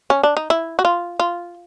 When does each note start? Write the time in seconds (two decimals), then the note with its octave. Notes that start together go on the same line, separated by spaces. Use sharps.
0.10 C#4
0.23 D4
0.37 D#4
0.50 E4
0.79 F#4
0.85 F4
1.20 F4